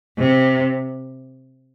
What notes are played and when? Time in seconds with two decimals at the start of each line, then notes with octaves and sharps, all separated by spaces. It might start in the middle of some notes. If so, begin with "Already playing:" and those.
0.18 C3